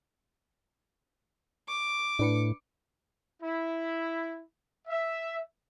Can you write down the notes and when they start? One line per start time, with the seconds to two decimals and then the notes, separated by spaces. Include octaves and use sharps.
1.68 C#6 D6
2.19 A2 D4 B4 C#7
3.41 E4
4.87 E5